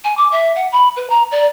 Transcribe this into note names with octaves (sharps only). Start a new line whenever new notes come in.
G#5
D6
E5
F#5
B5
B4
A#5
D5